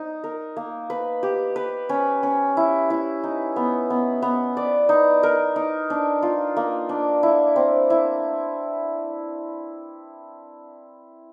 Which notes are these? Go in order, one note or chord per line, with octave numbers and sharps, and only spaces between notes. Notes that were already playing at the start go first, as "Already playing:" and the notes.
Already playing: D#4
A#4
A#3
B4
G4
B4
C#4
C#4
E4
E4
D#4
B3
B3
B3
D5
D#4
A#4
D#4
D4
F4
A#3
D4
E4
C4
E4